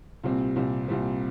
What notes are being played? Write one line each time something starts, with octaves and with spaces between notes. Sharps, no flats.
C2 A#2 G3 C4
C2 A#2 G3 C4
C2 A#2 G3 C4